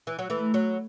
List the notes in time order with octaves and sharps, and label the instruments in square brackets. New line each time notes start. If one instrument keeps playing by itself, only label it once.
[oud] E3
F#3
E3 A3
F#3